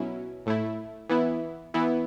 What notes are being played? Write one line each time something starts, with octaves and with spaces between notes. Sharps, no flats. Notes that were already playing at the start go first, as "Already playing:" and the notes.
Already playing: B2 F#3 C#4 E4
A2 A3 E4
E3 B3 E4
E3 B3 E4